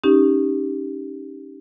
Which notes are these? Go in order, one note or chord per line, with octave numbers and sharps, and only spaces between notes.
C#4 D#4 G4